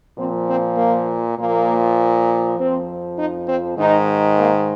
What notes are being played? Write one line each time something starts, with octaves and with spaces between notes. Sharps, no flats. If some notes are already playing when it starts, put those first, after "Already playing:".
A#2 F3 C4
C4
A#3
A#2 F3 A#3
F2 F3 C4
D#4
C4
G#2 D#3 D#4
A#3